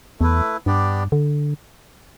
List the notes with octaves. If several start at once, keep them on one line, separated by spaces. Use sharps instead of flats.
E2 A3 E4 B4
G2 B3 D4 G4 D5
D3